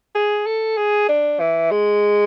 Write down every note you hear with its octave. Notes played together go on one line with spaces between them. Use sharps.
G#4
A4
G#4
D4
E3
G#3